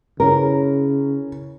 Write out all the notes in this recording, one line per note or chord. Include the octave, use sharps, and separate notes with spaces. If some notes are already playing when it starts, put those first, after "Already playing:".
C#3 C#4 E4 A#4 C#5